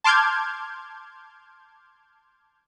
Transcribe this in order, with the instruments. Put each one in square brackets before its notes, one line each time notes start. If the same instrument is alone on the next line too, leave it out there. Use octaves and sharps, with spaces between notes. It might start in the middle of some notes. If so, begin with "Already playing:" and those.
[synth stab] A5 C6 D6 F6 G6 G#6